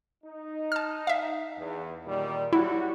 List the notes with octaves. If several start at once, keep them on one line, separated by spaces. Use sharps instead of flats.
D#4
A5 F6
E5 F5
E2
A#2 D#3 G3
F#3 G3 E4 F#4